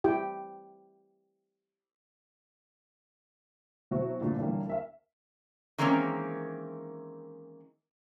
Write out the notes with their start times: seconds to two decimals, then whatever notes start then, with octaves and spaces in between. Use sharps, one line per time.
0.04 E4 G4 G5
3.91 B2 F#3 C4 E4 F#4
4.21 D2 G2 A#2 D3
4.38 B1 D3 E3 G3 A#3
4.67 A#4 E5 F5
5.78 D#3 E3 G#3 A#3 C4 C#4